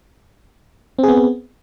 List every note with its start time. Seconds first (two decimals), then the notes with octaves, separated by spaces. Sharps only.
0.99 C4
1.03 G#4
1.08 B3